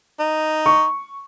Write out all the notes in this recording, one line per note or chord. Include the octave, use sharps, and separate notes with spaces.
D#4
C#6